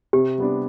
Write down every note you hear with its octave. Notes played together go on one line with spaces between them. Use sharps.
C3 G4
G3 B3 D4